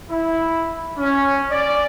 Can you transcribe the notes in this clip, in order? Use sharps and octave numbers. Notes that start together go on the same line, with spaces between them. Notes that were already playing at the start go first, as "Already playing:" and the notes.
E4
C#4
D5